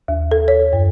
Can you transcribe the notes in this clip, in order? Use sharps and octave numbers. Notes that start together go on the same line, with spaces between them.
D#2
A4
C#5
F#2